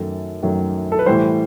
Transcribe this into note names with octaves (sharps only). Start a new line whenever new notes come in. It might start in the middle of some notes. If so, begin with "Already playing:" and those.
Already playing: F#2 D#3 F#3 A3 A4
F#2 D#3 F#3 A3
A4
B4
A2 E3 G3 C5